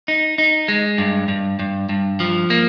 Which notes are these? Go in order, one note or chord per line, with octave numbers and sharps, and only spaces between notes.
D#4
D#4
G#3
G2
G2
G2
G2
F3
A#3